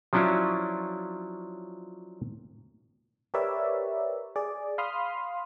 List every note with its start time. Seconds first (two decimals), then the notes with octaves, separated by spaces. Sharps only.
0.13 F3 F#3 C#4 D4 E4 F4
3.34 G4 A#4 B4 C#5 D5 E5
4.36 G#4 D5
4.78 F5 B5 C6 D#6 F6